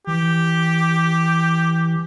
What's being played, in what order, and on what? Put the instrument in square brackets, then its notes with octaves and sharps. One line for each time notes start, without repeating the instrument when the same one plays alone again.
[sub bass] E3 [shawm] G4